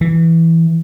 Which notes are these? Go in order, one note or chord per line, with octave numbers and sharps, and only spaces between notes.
E3